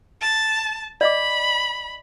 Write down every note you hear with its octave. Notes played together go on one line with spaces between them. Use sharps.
A5
D5 D#5 B5 D6